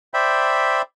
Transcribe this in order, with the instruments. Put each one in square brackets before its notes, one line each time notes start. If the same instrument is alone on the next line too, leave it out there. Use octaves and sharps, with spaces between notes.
[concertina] C5 D5 E5 G5 B5